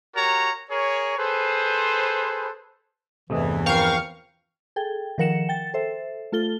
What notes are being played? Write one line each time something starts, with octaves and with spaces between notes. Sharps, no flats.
F#4 G4 A#4 C#5 A#5
G#4 A#4 C#5
G#4 A4 B4 C5
E2 G2 C3 E3 A3 D#5
F3 C4 A#4 F5 G5 C#6
G#4 A4 G5
D#3 F3 A#4 F#5 C#7 E7
G5 A6
A4 C5 E5
A3 F4 A4 G7